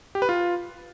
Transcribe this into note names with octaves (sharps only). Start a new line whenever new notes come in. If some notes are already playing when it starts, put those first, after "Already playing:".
G4
B4
F4